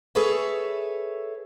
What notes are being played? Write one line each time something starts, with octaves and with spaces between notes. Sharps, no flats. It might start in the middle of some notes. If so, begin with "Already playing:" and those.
G#4 A4 B4 C#5 E5